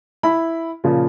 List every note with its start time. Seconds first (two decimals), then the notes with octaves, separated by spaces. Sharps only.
0.23 E4 B5
0.84 A#2 C#3 F3